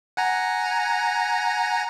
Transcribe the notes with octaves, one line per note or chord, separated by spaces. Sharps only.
F#5 G#5 A#5